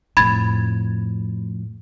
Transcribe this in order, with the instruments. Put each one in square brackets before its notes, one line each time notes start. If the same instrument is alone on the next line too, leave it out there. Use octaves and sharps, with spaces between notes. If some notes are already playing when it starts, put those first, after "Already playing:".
[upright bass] F2 A2 [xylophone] B5 G#6 A6